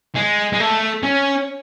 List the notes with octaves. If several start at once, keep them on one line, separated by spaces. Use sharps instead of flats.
G#3
G#3
A3
C#4